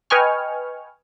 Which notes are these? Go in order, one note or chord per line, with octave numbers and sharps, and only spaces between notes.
B4 D#5 G5 G#5 C#6 F6